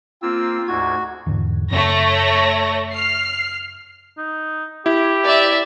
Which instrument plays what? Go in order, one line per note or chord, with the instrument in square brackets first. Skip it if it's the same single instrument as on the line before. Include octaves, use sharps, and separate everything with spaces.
[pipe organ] A#3 C4 [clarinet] F4 [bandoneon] E6
[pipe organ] D2 G#2 G#6 [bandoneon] F#4
[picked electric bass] E2 G#2 D3
[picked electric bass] F#2 C#3 C4 [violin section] A3 C#5 A#6
[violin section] F6 C7
[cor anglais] D#4
[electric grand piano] E4 [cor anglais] G4
[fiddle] D5 E5